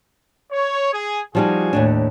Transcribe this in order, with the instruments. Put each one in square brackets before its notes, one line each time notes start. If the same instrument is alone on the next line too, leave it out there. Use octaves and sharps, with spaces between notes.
[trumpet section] C#5
G#4
[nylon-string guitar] F3 G3 D#4 [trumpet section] F#4 G#4 G#5
[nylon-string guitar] D#2 A2 D4